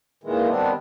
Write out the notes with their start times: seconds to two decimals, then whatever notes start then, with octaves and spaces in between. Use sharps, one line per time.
0.23 A#2 D#3 E3 G#3
0.48 G2 D#3 B3 C4 D4